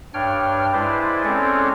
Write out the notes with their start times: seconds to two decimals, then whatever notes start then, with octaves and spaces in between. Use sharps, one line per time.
0.14 G2 D4 C#5 G5 F6
0.73 G#3 E4 B4 C5 D5
1.24 G#3 C4 C#4 A4 C#5 D5